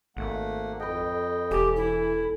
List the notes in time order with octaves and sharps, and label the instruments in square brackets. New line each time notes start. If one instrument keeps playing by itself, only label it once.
[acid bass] G#1 [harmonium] A3 A#3 F#5
[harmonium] F2 D#5 G5 [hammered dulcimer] A4 B4
[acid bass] E1 [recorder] G4 [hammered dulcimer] A4 G#5
[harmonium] E3 [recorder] E4